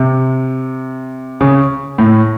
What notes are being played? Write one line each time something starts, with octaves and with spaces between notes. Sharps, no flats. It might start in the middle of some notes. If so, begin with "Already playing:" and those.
Already playing: C3
C#3
A2